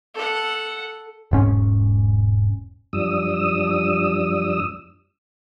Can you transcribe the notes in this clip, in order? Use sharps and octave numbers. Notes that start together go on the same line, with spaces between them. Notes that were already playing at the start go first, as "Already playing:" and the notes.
A4 F#5
E1 G#2 C#4
F#2 F3 G3 D4 D#6 E6